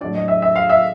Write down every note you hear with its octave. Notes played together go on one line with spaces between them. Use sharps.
A2 F#3 A3 D4 D5
D#5
E5
E5
F5
E5